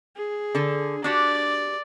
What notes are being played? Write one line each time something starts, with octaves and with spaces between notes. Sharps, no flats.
G#4
D3 A4
D4 F#4 G4 D5